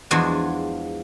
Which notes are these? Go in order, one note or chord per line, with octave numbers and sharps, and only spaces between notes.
E2 F3 G#3 D4 F#4